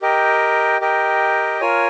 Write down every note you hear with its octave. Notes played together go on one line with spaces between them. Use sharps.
G4 A#4 D#5 G5
G4 A#4 D#5 G5
F4 A#4 C#5 G#5